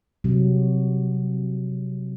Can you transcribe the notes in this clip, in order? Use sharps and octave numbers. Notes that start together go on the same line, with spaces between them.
C3 F#3